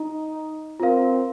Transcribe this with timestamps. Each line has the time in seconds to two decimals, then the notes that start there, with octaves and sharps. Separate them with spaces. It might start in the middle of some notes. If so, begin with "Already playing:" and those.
Already playing: D#4
0.80 C4 F4 A#4 F5